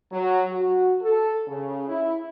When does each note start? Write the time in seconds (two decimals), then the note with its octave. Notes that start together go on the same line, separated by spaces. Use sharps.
0.11 F#3
0.50 F#4
1.02 A4
1.47 C#3
1.88 E4